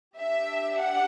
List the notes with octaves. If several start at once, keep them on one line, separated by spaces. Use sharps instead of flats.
D4 G4 E5
F#5